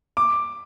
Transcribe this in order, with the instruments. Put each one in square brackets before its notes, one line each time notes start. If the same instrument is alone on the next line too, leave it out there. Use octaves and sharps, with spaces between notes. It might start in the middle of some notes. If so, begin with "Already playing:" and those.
[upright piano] D6